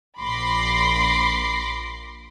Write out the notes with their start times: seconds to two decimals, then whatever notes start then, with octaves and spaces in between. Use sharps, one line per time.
0.19 A#1 B5 C6 D6 A#6 C7